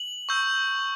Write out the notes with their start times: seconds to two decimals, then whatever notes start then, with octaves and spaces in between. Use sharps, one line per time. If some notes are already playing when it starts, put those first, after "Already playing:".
Already playing: F#7
0.29 C#6 E6 G6